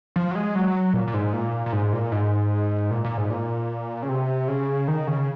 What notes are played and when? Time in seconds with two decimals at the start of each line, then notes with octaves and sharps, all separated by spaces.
0.16 F3
0.31 F#3
0.35 G#3
0.55 F#3
0.94 A#2
1.07 A#2
1.14 G#2
1.33 A#2
1.66 A#2
1.73 G#2
1.93 A#2
2.12 G#2
2.91 A#2
3.04 A#2
3.17 G#2
3.30 A#2
4.02 C#3
4.09 C3
4.48 C#3
4.88 D#3
5.07 C#3